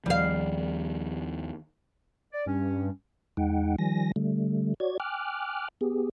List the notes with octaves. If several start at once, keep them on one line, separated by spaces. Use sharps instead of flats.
D#2 F3 G3 F5
D5
G2 C#4
E2 G#3 D#4 F#5 G5
D#3 F3 G3 G#5 A#6
D3 G3 A3
F#4 C#5 D5 G#6
G5 G#5 D6 F6 F#6
B3 G4 G#4